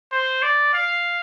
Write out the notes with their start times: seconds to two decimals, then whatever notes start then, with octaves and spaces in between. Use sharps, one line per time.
0.12 C5
0.42 D5
0.74 F5